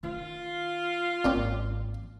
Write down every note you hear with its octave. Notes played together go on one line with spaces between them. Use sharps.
D#3 C#4 F4
G#1 A#2 C4 C#4